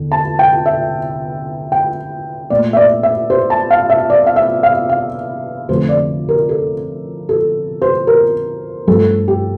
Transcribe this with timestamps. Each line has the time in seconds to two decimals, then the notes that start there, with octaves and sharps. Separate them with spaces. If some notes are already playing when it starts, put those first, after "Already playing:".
Already playing: E2 D3
0.12 A5
0.39 G5
0.66 E5
1.72 G5
2.50 A#2 A3 D5
2.73 E5
2.77 D5
3.03 E5
3.30 C5
3.50 A5
3.71 F5
3.90 E5
4.10 D5
4.26 F5
4.36 E5
4.63 F5
4.89 F5
5.69 F2 D3 F3 A3 C5
5.89 D5
6.29 A#4
6.49 A4
7.29 A4
7.82 C5
8.07 A#4
8.87 G2 F3 A3 A4
9.28 G4